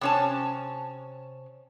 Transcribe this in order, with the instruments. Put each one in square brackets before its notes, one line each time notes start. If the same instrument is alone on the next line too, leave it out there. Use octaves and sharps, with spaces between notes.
[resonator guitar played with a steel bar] C3 C#4 A5